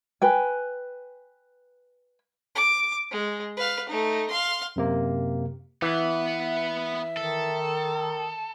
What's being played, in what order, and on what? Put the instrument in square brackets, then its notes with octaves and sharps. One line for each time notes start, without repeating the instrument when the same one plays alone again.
[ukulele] B4 G5 G#5
[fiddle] D6
G#3
B4 F5
A3 D#4
F5 C6
[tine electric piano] F#2 C3 A#3
[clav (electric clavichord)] E3 [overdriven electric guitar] B3 B4 [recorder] E5
[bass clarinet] D#3 [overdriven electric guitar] A4